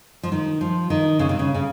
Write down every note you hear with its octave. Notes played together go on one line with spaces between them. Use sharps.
F3
D#3
F3
D#3
C#3
C3
C#3
C#3